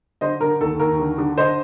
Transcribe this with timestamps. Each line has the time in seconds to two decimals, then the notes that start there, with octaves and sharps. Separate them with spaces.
0.21 D3 C5 D#5
0.40 D3 A#4
0.61 D#2 A4
0.79 D#2 A#4
1.00 D3
1.18 D3
1.37 D3 C5 D#5